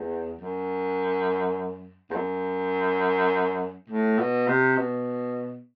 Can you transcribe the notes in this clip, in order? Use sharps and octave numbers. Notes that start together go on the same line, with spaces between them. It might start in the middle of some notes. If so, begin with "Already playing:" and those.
Already playing: E2
F#2
E2
F#2
A2
B2
C3
B2